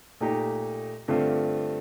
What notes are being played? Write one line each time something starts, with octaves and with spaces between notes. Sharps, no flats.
A#2 A3 D#4 G4
G2 D3 A3 C4 F4